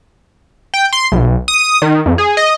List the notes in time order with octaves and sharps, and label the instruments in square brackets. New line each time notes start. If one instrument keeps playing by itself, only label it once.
[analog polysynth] G5
C6
B1
D#6
D#3
F2
G#4
D#5